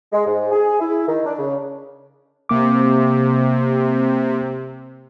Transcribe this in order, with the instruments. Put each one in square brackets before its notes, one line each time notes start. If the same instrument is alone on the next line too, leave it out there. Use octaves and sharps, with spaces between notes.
[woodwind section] G#3
G#2
G#4
E4
D#3
D4
C#3
[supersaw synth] C3 [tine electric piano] A#3 D6